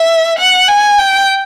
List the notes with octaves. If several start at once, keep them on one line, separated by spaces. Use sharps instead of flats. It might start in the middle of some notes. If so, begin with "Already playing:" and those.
Already playing: E5
F#5
G#5
G5